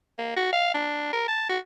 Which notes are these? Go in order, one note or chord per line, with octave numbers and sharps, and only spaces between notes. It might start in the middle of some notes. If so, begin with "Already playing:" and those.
A#3
F#4
F5
D4
A#4
A5
F#4